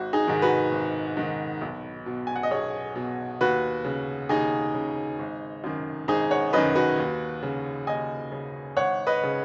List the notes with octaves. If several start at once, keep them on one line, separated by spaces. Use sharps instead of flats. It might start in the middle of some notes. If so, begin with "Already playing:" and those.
Already playing: G#1 F#4
D#4 G#4
G#2 D#3
F#4 B4
G#1
G#2 D#3
B1
B2
G#5
F#5
D#5
B1 G#4 C#5
B2
D#2 F#4 B4
C#3
D#2 D#4 G#4
C#3
G#1
F#2 D#3
G#1 D#4 G#4
C#5 F#5
F#2 D#3 B4 D#5
F#4 B4
D#2
C#3
D#2 D#5 G#5
C#3
G#1 C#5 F#5
B4 D#5
C#3